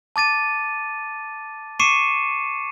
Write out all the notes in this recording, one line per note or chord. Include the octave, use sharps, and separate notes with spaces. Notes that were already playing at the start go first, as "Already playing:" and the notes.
A5 D6 A6 D#7
C#6 D6 C7 C#7 D#7 E7